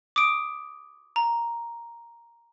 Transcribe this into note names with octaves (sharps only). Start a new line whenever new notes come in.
D6 D#6 D7
A#5